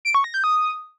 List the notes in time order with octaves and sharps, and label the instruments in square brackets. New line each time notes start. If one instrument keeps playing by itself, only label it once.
[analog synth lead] D7
C#6
A#6
G6
D#6